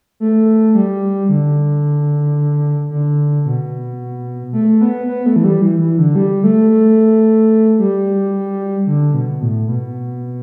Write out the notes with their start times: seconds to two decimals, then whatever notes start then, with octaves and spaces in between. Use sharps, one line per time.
0.20 A3
0.74 G3
1.29 D3
2.90 D3
3.46 B2
4.53 A3
4.81 B3
5.07 B3
5.26 A3
5.36 E3
5.44 G3
5.62 E3
5.80 E3
5.99 D3
6.16 G3
6.44 A3
6.70 A3
7.79 G3
8.87 D3
9.14 B2
9.41 A2
9.68 B2